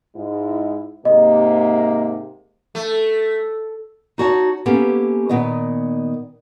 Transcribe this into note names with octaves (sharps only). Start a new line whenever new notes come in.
G#2 G#3 E4
G#2 C3 A#3 D#5
A3
D#4 F#4 C#5 A5
A#3 B3 C#4 G4 A4
A#2 D#3 B3 C#5 D#5